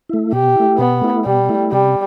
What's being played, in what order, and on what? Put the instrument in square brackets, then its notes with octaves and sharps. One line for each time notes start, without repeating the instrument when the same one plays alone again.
[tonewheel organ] A3 E4
[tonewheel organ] B2 [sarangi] G4
[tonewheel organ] A3 E4
[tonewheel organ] B2 [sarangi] B3
[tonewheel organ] A3 E4
[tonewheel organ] B2 [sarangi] G3
[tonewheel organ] A3 E4
[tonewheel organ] C3 [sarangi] G3